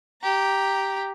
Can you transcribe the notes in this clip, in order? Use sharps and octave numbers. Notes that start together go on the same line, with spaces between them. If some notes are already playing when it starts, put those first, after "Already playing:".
G4 A#5